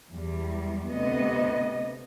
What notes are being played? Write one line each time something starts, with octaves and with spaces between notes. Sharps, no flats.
E2 G3
D2 C3 B3 D#5